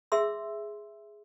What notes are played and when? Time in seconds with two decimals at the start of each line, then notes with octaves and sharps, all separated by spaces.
0.12 G#4 E5 C6 E6